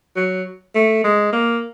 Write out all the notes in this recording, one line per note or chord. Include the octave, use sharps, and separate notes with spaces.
F#3
A3
G#3
A#3